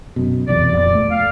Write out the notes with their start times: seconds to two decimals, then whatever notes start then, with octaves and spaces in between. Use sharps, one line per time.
0.16 F#2 B2
0.47 F1 B1 E2 D5
0.72 D#1 F2
0.95 A3
1.10 F5